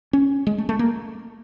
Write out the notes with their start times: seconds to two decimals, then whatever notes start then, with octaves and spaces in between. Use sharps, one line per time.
0.13 C#4
0.47 G#3
0.58 A3
0.69 A3
0.79 A#3